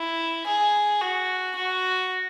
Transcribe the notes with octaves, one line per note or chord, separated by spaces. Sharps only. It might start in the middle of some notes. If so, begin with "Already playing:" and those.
Already playing: E4
G#4
F#4
F#4